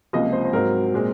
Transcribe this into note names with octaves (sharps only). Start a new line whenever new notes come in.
C#2 C3 F3 A#3 D#5
C5
C5
G#2 F#3 C4 A#4
A#2 G#3 C4